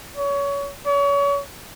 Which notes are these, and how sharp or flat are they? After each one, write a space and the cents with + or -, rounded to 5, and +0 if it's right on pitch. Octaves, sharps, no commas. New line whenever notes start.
C#5 +25
C#5 +35